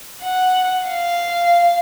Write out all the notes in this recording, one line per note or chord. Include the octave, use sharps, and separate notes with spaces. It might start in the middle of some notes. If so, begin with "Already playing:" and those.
F#5
F5